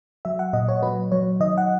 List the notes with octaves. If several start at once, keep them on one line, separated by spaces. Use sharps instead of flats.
F#3 E5
F#5
A#2 D#5
C#5
F#3 B4
F#3 C#5
D#3 D#5
F#5